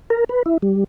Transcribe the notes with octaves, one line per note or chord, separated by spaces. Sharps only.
A#4
B4
E4
G3